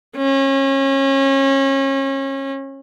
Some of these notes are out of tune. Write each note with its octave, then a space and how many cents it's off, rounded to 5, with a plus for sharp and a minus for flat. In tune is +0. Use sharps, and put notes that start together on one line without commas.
C#4 -30